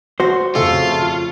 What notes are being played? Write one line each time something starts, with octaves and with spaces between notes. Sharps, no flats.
F#4 C5
F2 C#3 A3 F4 A4